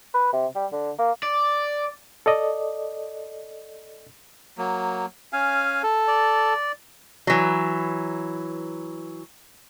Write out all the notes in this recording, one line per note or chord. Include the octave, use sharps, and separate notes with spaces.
B4
C3
G3
D3
A#3
D5
A4 D5 D#5
F#3 A#3
C#4 F5 G#5
A4
D5
E3 F#3